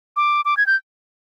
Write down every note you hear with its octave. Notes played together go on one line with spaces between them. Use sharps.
D6
D6
G#6
G6